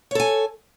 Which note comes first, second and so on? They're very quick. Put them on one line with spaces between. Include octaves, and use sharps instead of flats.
C#5 A4 G#5